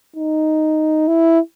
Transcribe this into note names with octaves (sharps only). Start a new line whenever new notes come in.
D#4
E4